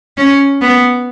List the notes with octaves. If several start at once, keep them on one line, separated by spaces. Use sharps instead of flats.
C#4
B3